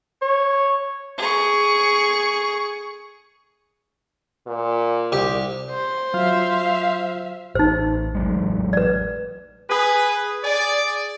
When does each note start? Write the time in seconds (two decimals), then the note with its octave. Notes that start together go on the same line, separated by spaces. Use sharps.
0.22 C#5
1.18 G#4 C#6
4.47 A#2
5.12 C2 G4
5.71 C5
6.14 F#3 F4 E5 F5 F6
7.55 A1 D#4 C5
8.15 A1 F#3 G#3
8.73 B4 D5
9.70 G#4 B4
10.44 G#4 D5